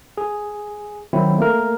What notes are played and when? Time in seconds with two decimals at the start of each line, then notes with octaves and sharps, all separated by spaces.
0.18 G#4
1.13 D#3 F#3 C4 E4
1.38 A3 A#3 A#4